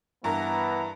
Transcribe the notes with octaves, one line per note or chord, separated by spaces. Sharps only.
G2 E3 B3 A#4 A#5